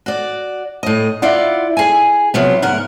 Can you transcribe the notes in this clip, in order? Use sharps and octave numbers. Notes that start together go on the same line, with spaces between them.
F#4 D5
A2 D#5
E4 F4 D5 F#5
G#4 G#5
C3 F3 F#3 B3
D2 G#2 A#4 F#5